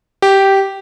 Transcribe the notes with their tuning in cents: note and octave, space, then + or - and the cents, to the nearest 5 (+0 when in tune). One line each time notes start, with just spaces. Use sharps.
G4 -10